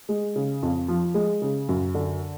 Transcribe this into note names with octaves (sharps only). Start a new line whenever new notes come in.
G#3
C#3
F2
F3
G#3
C#3
F#2
D3